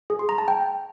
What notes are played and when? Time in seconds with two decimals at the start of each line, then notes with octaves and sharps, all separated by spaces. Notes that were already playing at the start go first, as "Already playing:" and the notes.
0.10 G#4
0.19 C6
0.29 A#5
0.38 A5
0.48 G5